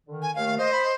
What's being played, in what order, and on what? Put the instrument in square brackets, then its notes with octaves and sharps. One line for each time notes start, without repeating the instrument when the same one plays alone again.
[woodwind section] D3 D#3
[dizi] G#5
[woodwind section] D#2 D#3 A3 [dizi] F5
[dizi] C5 [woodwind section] D#5
[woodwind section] B5
D#5 C6